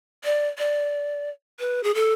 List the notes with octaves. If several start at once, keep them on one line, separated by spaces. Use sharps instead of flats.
D5
D5
B4
G#4
A4